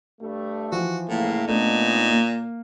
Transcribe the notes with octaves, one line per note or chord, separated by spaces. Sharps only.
G2 G3 A3
E3 F3 F#4
A2 C#3 A3 A#3
A#2 A3 B3 D4 D#4
A#3